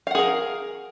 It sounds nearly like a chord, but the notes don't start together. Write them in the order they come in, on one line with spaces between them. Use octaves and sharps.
F5 F#5 G#4 A#4